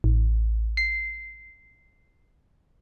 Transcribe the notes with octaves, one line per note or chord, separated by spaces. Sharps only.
A1
C7